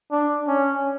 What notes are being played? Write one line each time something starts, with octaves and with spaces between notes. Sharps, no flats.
D4
C#4